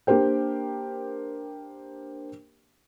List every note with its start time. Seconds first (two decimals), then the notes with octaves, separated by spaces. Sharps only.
0.07 A#3 D4 G4 A#4 C5 G5